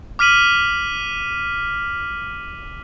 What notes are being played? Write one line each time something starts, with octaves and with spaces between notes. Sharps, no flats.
D6 F6 B6 D#7 F#7